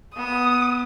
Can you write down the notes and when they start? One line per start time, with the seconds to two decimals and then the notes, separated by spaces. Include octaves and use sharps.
0.16 B3 D#6